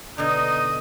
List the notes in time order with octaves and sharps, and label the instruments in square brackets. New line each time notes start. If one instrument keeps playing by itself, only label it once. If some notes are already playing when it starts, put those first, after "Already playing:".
[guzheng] B2 D3 [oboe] D#4 [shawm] D#5